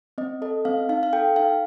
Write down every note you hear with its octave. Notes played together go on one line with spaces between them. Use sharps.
C4 D#5
A4 D#5
C4 F5
D#4 F5
F5
A4 G5
D#4 F5